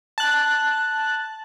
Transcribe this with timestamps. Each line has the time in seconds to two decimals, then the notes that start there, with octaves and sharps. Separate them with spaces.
0.18 A5 F#6